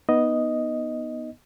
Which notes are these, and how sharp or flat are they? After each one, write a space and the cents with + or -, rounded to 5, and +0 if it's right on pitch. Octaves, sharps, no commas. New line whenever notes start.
B3 -15 D#4 +0 D#5 +0